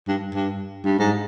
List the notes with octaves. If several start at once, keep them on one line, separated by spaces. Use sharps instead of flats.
G2
G2
G2
G#2